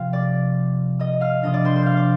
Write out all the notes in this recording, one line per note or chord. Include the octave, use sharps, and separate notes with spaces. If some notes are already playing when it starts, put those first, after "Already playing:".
Already playing: C3 F3 C4 F5 F6
D5 D6
D#5 D#6
F5 F6
C3 F3 A#3 D4 D#5 D#6
D5 D6
C5 C6
C5 C6
F5 F6 G6
D5 D6